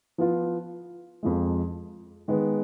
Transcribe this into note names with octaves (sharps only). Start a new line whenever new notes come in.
F3 B3 F4
F2 F3 G#3
D#3 G#3 B3